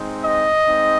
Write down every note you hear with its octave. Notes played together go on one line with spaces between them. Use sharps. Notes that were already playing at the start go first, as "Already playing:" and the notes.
Already playing: G#3 C4 D#4
D#5
G#3 C4 D#4